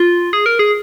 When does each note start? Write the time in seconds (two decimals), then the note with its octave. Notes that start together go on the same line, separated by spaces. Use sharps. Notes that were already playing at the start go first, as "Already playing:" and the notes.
Already playing: F4
0.33 G#4
0.46 A#4
0.59 G#4